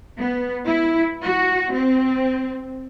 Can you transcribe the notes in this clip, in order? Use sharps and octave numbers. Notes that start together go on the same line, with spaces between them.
B3
E4
F#4
C4